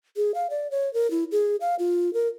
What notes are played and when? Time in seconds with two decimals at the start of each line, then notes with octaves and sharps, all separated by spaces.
0.17 G#4
0.35 F5
0.50 D5
0.71 C#5
0.94 A#4
1.11 E4
1.32 G#4
1.61 F5
1.79 F4
2.14 A#4